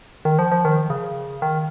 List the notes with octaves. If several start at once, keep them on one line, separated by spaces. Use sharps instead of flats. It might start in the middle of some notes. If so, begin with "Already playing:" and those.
D#3
F3
F3
D#3
C#3
D#3